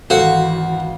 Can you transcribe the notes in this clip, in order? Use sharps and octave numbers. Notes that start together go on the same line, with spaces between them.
G#1 E3 F#4 A4 C5 F5 F#5